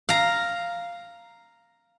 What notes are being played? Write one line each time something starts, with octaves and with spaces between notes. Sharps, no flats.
F5 A#5